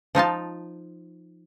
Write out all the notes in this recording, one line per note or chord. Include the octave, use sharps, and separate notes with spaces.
F3 D#4 F4 A5